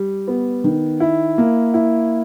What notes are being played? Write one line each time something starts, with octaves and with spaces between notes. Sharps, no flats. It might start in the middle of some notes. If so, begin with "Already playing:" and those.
Already playing: G3
B3
D#3
E4
A#3
E4